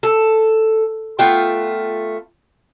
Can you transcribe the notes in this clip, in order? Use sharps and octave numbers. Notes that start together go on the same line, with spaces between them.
A4
A3 B3 F4 G5